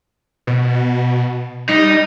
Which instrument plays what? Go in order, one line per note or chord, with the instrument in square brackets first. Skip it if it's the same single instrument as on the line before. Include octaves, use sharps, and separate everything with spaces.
[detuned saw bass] B2
[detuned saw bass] G3 [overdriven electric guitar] D#4